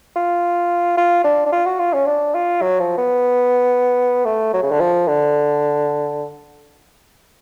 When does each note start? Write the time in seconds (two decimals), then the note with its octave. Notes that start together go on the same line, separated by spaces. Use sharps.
0.15 F4
0.97 F4
1.24 D4
1.46 D4
1.52 F4
1.66 F#4
1.79 F4
1.93 C#4
2.06 D4
2.34 F4
2.62 F#3
2.80 F3
2.98 B3
4.25 A3
4.53 F#3
4.63 C#3
4.71 D3
4.80 F3
5.08 D3